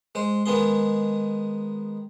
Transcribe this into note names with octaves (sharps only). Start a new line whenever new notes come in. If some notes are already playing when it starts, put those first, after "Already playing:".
G#3 C5
D#3 G#3 B3 G#4 C6